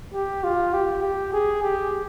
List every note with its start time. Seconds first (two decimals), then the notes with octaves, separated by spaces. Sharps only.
0.14 G4
0.44 F4
0.73 G4
1.03 G4
1.33 G#4
1.63 G4